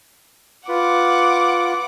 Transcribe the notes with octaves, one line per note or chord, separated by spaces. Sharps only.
F4 B4 F#5 D6